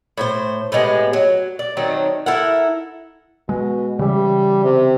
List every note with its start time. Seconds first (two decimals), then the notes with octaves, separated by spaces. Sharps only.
0.17 A2 E4 C5
0.72 A2 C3 G#3 B3
1.13 F#3
1.59 D5
1.77 D#3 F#3 C4 D4
2.26 E4 A4 A#4 F#5
3.49 B2 G#3
3.99 C#3 E3 G3
4.64 C3